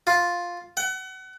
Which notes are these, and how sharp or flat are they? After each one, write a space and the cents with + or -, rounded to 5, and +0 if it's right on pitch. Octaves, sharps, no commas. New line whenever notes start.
F4 +5
F#5 +30